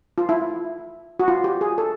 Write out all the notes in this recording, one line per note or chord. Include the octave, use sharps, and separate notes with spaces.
F4
E4
F#4
F4
G4
G#4
A4